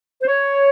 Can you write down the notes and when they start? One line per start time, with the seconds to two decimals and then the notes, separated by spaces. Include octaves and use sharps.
0.22 C5
0.27 C#5